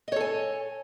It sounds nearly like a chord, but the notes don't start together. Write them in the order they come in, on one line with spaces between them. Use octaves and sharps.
D#5 C#5 A4 G#5